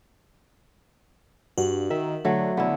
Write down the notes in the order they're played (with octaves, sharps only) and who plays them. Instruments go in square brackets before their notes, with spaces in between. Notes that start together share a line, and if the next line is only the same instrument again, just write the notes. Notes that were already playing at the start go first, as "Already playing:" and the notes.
[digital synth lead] G2 [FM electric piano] F#4
[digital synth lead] D#3 [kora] E5
[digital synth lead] D3 [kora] F#3 A3
[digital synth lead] D3 [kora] B3 E4